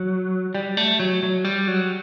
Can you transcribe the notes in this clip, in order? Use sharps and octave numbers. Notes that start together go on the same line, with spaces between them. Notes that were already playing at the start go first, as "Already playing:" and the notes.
Already playing: F#3
G3
A3
F#3
F#3
G3
F#3